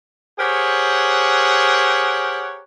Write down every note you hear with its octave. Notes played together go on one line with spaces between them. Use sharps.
G4 G#4 A#4 C5 C#5 F#5